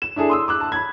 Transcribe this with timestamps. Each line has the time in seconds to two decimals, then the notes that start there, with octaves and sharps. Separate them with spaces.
0.02 E7
0.16 D4 E4 G#4 A4
0.30 C6 D#6 E6
0.48 D6 E6 F#6
0.60 A5
0.72 B5 G#6